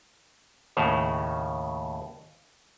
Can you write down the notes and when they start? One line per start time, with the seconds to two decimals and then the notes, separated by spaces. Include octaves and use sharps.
0.77 D#2 A2 C#3